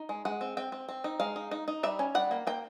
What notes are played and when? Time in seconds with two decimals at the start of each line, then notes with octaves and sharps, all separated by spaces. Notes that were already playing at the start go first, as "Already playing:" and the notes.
Already playing: D#4
0.09 G#3
0.25 G#3 F#5
0.41 C4
0.57 C4 G5
0.72 C4
0.89 C4
1.04 D#4
1.20 G#3 F5
1.36 D#4
1.51 D#4
1.68 D#4
1.83 G3 E5
1.99 C#4
2.15 G3 F#5
2.31 A#3
2.47 A#3 G5